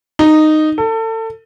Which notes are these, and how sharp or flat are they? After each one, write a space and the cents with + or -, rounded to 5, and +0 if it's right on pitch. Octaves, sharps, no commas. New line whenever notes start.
D#4 -10
A4 +30